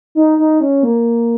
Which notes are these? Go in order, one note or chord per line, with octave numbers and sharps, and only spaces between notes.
D#4
D#4
C#4
A#3